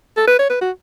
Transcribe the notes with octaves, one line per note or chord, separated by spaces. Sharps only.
A4
B4
C#5
B4
F#4